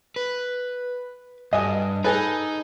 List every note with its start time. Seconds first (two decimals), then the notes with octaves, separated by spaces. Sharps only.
0.16 B4
1.53 G2 D#5 G#5 D#6
2.04 D#4 G#4 A4 B4